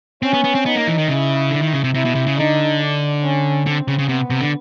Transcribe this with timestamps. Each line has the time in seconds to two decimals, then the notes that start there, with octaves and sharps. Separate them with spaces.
0.22 C4 C#4
0.34 B3
0.44 B3
0.55 C4
0.65 B3 D#4
0.76 A#3
0.87 E3
0.98 D#3
1.08 C#3 E4
1.51 D3
1.62 D#3
1.73 C#3
1.84 C3
1.94 C3 E4
2.05 B2
2.15 C3
2.27 C#3
2.37 D3 D#4
2.80 D4
3.23 C#4
3.66 D3 C4
3.88 C#3
3.99 C#3
4.09 C3 B3
4.30 C3
4.41 D3